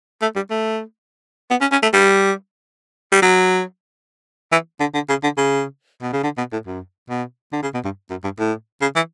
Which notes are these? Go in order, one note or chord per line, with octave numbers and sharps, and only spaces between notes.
A3
G3
A3
B3
C#4
C#4
A3
G3
G3
F#3
E3
D3
D3
C#3
D3
C#3
B2
C#3
D3
B2
A2
F#2
B2
D3
C#3
B2
G2
F#2
G2
A2
C#3
E3